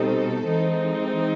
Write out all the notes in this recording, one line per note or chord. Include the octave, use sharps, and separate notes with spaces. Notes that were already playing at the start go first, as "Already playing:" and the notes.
Already playing: B2 G3 C4 D#4 A4
E3 G#3 C4 D#4